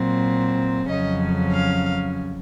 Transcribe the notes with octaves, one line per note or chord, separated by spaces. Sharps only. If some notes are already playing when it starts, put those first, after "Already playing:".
Already playing: A#2 F#3 C4
F2 C#3 F#3 C#4 D#5
F5